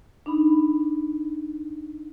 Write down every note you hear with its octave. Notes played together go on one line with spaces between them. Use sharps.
D4 D#4 B5